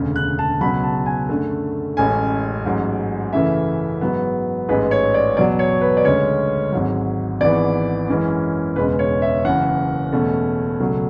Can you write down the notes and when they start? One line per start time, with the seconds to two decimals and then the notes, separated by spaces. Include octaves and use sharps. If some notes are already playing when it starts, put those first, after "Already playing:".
Already playing: E1 D2 C#3
0.16 F#6
0.39 A5
0.61 C#2 B2 F#3 B5
0.84 A5
1.06 G#5
1.29 F#2 D3 A3
1.97 A1 A2 G#3 C#4 G#5
2.65 A1 G#2 F#3
3.33 F#2 C#3 E3 A3 E5
4.01 G#2 F#3 B3
4.68 A1 G#2 G#3 B4
4.91 C#5
5.14 D5
5.37 E2 B2 F#3 D5
5.59 C#5
5.81 B4
5.97 D5
6.05 D2 C#3 G#3 C#4 C#5
6.72 G#1 G#2 F#3
7.40 G#1 G#2 E3 B3 D5
8.09 F#2 E3 G#3 C#4
8.76 E1 E2 C#3 G#3 C#4 B4
8.99 C#5
9.22 E5
9.45 F#1 F#2 E3 F#5
10.12 E2 B2 A3 C#4
10.80 C#2 B2 F#3 A3